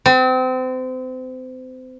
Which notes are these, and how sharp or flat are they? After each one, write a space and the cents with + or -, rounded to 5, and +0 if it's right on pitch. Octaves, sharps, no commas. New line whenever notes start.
C4 -30